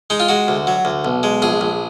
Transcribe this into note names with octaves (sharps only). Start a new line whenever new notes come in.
G#3 D#4
F4
G#3 F#4
D2
F#3
D2
B1
G#3
A#1 G#4
A#1